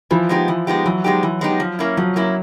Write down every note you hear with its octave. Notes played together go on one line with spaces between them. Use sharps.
E3 F3
G#3 B3 D#4 G4
E3
G#3 B3 D#4 G4
E3 F#3
G#3 B3 D#4 G4
E3
G#3 B3 D#4 G4
F3
A#3 C#4 E4
F3 F#3
A#3 C#4 E4